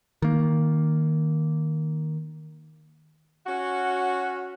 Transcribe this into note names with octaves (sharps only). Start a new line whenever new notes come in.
D#3 A#3
C#4 F#4